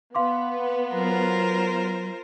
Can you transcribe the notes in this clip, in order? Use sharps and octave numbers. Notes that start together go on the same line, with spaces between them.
B3 F5 C6 D6
F#3 F4 A#4 C5